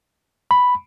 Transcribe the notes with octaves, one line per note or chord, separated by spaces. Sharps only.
B5